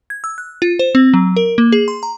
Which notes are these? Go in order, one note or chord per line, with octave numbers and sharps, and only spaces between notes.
G#6
E6
F#6
F4
C5
C4
F#3
A#4
A#3
G#4
C6
A#5